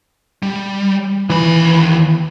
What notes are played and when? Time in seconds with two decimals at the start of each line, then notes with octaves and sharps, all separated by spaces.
0.43 G3
1.30 D#2 E3 B5